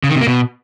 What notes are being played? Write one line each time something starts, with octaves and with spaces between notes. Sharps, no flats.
C#3
D#3
C3
A#3
B2